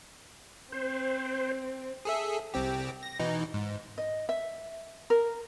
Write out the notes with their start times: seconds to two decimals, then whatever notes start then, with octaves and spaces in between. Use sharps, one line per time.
0.72 C4 C5
2.05 G#4 A4 E5
2.54 C2 C4 G4
3.03 A#6
3.19 B2 E3 D#4
3.54 G#2
3.98 D#5
4.29 E5
5.10 A#4